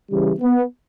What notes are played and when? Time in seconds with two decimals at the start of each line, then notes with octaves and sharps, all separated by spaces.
0.10 C#3 E3 G3
0.41 B3